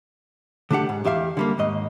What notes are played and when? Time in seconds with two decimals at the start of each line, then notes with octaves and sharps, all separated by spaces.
0.71 D3 A3 D4 G4 F#5
0.89 G#2
1.05 E2 G4 E5 F5
1.37 D3 G3 A#3
1.58 D#2 G#2 D#5